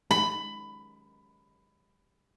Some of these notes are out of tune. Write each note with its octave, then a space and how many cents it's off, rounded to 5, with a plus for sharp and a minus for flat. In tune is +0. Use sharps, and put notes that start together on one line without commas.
B5 +15